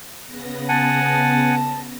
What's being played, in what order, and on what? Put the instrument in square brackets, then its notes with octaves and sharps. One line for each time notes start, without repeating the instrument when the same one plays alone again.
[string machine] C#3 B3 A#6
[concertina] F#5 G#5 [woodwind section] A5